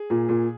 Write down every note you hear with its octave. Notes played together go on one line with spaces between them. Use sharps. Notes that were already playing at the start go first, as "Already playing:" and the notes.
Already playing: G#4
A#2
A#2